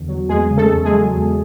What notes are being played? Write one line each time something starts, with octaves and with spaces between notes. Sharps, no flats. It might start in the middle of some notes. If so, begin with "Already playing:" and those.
Already playing: E2 D3
F#3
E2 G#3 G#4
C#3
A3 A4
E2
G#3 G#4
F#3
E2